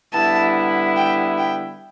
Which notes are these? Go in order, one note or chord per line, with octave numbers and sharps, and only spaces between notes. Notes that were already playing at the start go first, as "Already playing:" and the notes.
D3 G3 B3 E4 A5
G5
G5